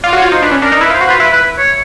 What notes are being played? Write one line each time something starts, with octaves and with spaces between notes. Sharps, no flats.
F4 D5
F#4
C#5
F4
D#4 C5
D4 B4
C#4
D4 A#4
D#4
E4 B4
F4
C5
F#4
F4 B4
E4 B4
B4
C#5